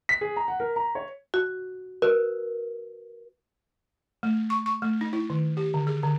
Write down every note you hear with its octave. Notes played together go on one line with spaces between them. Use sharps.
B6
G#4
A#5
F#5
A#4
A#5
C#5
F#4
F#4 A#4 B4
A3
C#6
C#6
A3
D#4
E4
D#3
G4
D3
G#4
D3